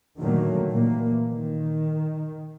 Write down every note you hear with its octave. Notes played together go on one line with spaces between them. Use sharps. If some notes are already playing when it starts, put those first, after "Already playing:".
A#2 D3 D#3 F#3 A3 A#3
A#2 E3 A#3
D#3